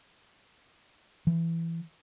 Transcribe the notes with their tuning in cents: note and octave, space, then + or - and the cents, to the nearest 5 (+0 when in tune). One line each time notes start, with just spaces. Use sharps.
E3 +15